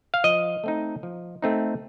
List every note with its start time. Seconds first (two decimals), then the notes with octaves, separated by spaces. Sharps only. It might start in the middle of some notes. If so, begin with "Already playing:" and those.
0.14 F5
0.24 F3 D#5
0.64 A3 C4 D#4
1.03 F3
1.42 A3 C4 D#4